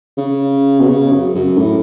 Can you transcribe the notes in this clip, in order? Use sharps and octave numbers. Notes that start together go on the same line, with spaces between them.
C#3
B2
C#3
F#2
F#2
A2